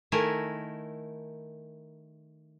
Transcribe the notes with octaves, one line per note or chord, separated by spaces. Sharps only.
D#3 A3 E4 A#4 G#5